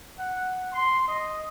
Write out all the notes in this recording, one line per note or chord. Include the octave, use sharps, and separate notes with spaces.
F#5
C6
D#5